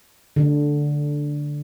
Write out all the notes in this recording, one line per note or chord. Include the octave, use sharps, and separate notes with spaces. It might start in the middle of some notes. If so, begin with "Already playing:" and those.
D3